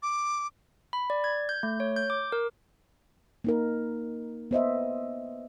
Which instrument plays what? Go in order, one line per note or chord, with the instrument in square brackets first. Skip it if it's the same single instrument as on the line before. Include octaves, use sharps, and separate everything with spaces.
[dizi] D6
[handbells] B5
D5
G#6
G6
A3
C#5
G6
D6
A#4
[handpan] A#3 D#4 A#4
B3 C5 D#5 E5